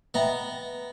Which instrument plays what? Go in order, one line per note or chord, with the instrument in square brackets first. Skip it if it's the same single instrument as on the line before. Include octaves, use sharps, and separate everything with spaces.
[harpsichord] B3 A#5 [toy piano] D#5 E5 G5